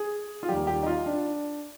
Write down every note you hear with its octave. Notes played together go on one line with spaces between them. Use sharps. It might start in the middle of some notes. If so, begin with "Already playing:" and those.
Already playing: G#4
F4
D#2 D#3 G3 G4
G4
D#4
F4
D4